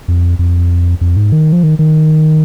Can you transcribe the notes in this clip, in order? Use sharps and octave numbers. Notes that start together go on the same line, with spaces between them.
F2
F2
F2
G#2
D#3
F3
D#3
D#3